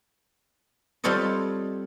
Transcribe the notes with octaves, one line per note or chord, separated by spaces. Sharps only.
G3 C4 F4 A4 C#5 D#5